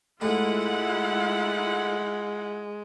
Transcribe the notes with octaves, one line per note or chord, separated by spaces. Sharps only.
G#2 G#3 A3 E4 F4 F#5